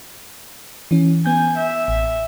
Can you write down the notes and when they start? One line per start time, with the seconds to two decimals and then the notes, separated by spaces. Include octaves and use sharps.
0.91 E3 C#4
1.26 B3 G#5 G6
1.58 E5
1.88 A1